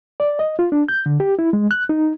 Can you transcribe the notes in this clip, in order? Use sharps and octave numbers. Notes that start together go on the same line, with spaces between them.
D5
D#5
F4
D4
G6
D3
G4
E4
G#3
F#6
D#4